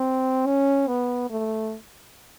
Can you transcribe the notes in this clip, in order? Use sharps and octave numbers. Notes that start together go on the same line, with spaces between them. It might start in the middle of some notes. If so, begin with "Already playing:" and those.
Already playing: C4
C#4
B3
A3